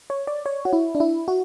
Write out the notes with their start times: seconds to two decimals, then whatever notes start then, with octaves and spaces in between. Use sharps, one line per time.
0.10 C#5
0.27 D5
0.46 C#5
0.65 F#4
0.73 E4
0.95 D4
1.00 E4
1.28 F#4